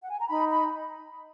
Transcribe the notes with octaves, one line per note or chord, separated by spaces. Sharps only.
F#5
G#5
A#5
D#4 B5
B5